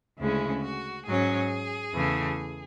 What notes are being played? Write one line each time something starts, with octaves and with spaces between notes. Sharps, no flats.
D2 C#3 G#3 C#4 E4
F#4
G#2 F#3 C#4 G#4
E2 C#3 E3 A3